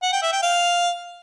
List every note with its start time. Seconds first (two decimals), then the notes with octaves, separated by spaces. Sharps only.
0.02 F#5
0.12 G5
0.22 E5
0.32 G5
0.42 F5